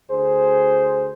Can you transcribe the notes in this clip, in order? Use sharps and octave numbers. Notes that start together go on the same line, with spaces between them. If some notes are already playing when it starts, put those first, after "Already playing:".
D2 G#4 C5